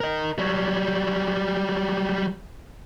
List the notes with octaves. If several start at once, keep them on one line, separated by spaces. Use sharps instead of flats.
A#4 D#5
F#3 G3